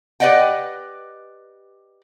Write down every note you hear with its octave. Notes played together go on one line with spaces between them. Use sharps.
G4 B4 D5 D#5 F#5 G5